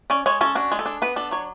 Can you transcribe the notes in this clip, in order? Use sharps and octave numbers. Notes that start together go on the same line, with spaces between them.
C#4 D5
G#3 C#5
C#4 A4
D4 F#4
G#3
A4
D4
B3 B4
D4 A4
F#3 C#5